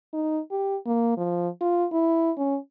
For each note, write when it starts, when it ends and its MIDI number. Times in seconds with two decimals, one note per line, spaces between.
0.13 0.40 63
0.51 0.77 67
0.86 1.15 58
1.17 1.49 53
1.61 1.86 65
1.92 2.31 64
2.37 2.58 61